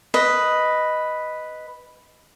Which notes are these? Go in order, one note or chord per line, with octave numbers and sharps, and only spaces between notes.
B4 D#5